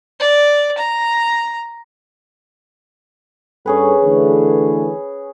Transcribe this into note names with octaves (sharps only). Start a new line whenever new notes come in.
D5
A#5
G2 C#4 G#4 A4 B4
D3 E3 A3